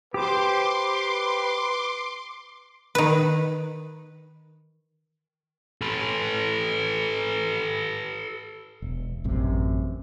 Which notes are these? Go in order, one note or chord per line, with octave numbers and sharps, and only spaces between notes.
G4 B4 C5 C6 D6
D#3 B4
A4 B4
E1
A1 F#2 C3